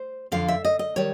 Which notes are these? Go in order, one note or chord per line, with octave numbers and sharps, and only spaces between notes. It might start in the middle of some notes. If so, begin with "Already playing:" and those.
Already playing: C5
F2 D3 F3 F5
E5
D#5
D#5
D#3 G3 C#5